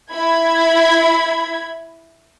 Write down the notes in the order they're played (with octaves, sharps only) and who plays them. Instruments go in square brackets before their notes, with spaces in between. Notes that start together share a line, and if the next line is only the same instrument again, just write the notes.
[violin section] E4 B5 G#6